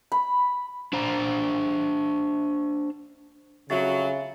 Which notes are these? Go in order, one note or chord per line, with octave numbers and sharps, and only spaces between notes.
B5
D4 C5 F5 A#5
F2 C#3 F#3 F#4 E5 A6